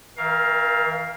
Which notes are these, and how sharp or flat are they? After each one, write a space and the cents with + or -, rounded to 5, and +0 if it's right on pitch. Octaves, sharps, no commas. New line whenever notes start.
E3 -35 A#4 +20 F5 +0